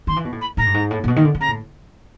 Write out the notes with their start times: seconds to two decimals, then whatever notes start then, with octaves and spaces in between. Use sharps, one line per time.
0.07 D#3 C6
0.16 E3
0.25 B2
0.32 A2
0.41 B5
0.57 A2 A#5
0.66 G2
0.74 G#2
0.91 A2
1.04 A#2
1.08 B2
1.16 D#3
1.25 D3
1.35 D3
1.40 C#3 A#5
1.48 A2